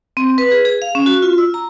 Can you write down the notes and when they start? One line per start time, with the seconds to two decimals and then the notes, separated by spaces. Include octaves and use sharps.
0.17 C4
0.38 B4
0.52 G#4
0.65 G#4
0.82 F5
0.95 C#4
1.06 F#4
1.22 F4
1.38 E6
1.54 A#5